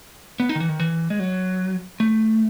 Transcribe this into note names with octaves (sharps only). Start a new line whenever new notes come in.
B3
D#4
D#3
E3
D#3
E3
G#3
F#3
A3